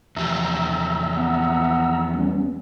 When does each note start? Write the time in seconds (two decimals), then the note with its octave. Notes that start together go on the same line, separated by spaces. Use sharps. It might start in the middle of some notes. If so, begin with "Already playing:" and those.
0.16 E2 F3 G4 E5 A#5 E6
1.16 B3
2.14 G3 B3 C#4